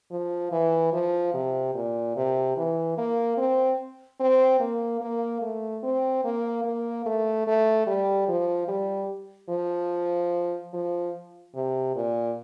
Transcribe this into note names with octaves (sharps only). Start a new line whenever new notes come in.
F3
E3
F3
C3
A#2
C3
E3
A#3
C4
C4
A#3
A#3
A3
C4
A#3
A#3
A3
A3
G3
F3
G3
F3
F3
C3
A#2